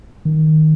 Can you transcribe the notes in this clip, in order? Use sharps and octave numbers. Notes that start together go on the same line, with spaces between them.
D#3